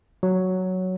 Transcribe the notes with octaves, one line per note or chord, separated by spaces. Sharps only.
F#3